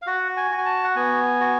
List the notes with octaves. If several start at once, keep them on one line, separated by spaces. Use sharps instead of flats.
F5
F#4 F#5
G#5
F#4
G#5
A5
F#5
B3 G#5
F#4